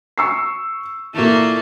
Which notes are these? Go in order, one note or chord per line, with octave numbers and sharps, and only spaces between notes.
C#6 E6 C7
A#2 E3 A3 A#3